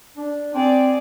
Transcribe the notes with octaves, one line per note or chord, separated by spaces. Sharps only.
D4
C4 G#4 D5